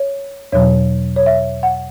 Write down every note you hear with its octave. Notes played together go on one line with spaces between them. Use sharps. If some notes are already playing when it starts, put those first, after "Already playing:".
Already playing: C#5
E2 B2 F#3 C#5
C#5
E5
F#5